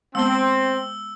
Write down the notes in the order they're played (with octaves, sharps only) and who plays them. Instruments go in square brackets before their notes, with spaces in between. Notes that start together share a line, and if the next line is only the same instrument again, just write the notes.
[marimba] G#3 B3 [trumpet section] C4 [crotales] E6 G7